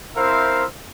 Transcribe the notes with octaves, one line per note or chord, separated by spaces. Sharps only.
C4 E4 A#4 C5 E5 F5